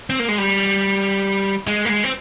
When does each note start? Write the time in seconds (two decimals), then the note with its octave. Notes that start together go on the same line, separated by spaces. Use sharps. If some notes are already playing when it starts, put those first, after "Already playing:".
0.10 C4
0.19 A#3
0.29 G#3
0.38 G3
1.67 G#3
1.85 A#3
1.89 G#3
2.04 C4